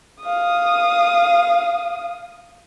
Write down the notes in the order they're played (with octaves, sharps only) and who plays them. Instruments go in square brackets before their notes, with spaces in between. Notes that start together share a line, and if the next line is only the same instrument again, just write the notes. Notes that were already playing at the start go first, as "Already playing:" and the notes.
[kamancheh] F5 D#6